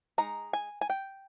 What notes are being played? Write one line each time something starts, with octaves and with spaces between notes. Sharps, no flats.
G#3 D#4 A#5
G#5
G#5
G5